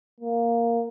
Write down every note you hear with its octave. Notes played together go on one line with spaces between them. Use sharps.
A#3